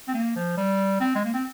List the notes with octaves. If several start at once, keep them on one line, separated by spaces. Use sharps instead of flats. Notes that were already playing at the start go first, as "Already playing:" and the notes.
C4
A#3
F3
G3
C4
G#3
A#3
C4